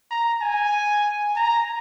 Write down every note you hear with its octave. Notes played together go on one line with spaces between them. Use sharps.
A#5
G#5
A#5